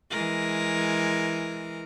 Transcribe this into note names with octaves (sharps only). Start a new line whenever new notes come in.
E3 G#3 A#4